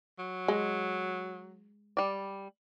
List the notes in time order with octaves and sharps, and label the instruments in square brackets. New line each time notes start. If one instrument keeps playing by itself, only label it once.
[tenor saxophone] F#3
[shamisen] G#3
[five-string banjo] G3 D5